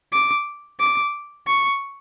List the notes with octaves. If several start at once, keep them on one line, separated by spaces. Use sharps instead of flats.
D6
D6
C#6